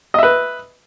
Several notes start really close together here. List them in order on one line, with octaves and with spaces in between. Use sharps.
D#5 E5 B4